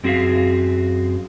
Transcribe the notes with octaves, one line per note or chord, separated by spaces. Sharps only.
F#2 C4 F#4 G#4 E5 F5